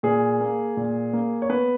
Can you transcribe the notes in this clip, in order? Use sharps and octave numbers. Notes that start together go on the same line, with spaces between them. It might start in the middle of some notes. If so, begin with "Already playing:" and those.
A#2 G#4
A#3
A#2
A#3
C#5
B3 B4